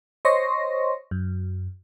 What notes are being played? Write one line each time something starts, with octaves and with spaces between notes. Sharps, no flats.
C5 C#5 D#5 C6 C#6 A#6
F#2